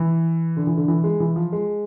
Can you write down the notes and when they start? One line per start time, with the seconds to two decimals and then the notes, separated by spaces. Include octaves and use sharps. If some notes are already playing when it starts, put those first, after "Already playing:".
Already playing: E3
0.57 D3
0.67 E3
0.77 D3
0.88 E3
1.04 G#3
1.20 E3
1.36 F3
1.52 G#3